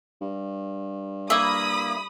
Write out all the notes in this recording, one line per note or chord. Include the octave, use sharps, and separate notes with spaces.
G2
A#3 E4 E5 B5 D#6